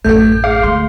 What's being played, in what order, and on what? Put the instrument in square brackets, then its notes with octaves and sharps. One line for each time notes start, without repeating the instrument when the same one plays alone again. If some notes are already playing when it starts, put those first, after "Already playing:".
[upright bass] A1 F#2 [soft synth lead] A3 [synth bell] A4 G6
[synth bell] G#4 [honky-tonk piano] F5 [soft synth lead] D6
[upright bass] D2 G#3 [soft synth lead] C6